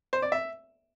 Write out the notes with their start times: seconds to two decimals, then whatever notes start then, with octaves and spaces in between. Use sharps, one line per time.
0.13 C5
0.22 D5
0.32 E5